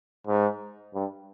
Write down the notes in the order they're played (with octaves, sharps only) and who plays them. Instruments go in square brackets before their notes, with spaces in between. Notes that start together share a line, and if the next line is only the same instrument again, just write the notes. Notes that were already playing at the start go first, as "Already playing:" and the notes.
[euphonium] G#2
G2